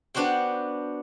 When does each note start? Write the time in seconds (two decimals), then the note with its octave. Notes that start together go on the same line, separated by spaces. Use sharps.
0.15 B3 D4 F#4 C5 G5